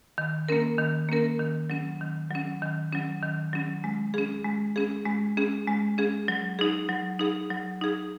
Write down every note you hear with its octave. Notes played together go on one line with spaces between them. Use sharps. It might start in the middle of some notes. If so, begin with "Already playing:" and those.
D#3
A#3 C#4 A#4
D#3
A#3 C#4 A#4
D#3
F#3 C#4
D#3
F#3 C#4
D#3
F#3 C#4
D#3
F#3 C#4
G#3
C#4 G#4
G#3
C#4 G#4
G#3
C#4 G#4
G#3
C#4 G#4
F#3
D#4 G#4
F#3
D#4 G#4
F#3
D#4 G#4